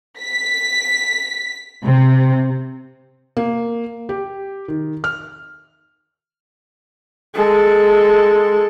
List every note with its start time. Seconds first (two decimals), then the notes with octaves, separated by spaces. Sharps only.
0.21 B6
1.84 C3
3.37 A#3
4.09 G4
4.68 D#3
5.04 F6
7.35 G#3 A4